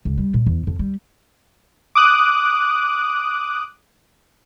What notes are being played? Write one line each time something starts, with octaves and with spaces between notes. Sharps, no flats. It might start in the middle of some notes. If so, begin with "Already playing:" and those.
C#2
G3
A#2
E2
F2
G3
D6 D#6 F#6